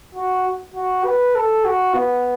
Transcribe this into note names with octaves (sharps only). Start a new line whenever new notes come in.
F#4
F#4
B4
A4
F#4
B3